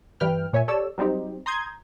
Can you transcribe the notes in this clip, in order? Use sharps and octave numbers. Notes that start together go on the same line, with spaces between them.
G2 E3 G3 B4 G5 F6
A#2 C#5 E5 G#5
G4 A4 C#5 D5 E6
F#3 G3 C4 D#4 G4
A#5 C6 D#6 G6 G#6